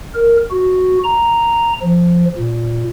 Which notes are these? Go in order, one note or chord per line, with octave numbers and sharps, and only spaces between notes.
A#4
F#4
A#5
F3
A#2